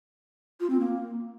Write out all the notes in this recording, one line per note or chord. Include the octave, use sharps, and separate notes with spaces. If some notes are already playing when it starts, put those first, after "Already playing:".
F4
C4
A#3